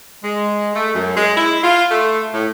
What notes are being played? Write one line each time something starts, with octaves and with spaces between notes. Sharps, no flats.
G#3
A3
F#2
G#3
E4
F4
A3
A2